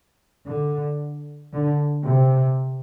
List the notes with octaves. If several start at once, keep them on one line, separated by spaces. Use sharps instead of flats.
D3
D3
C3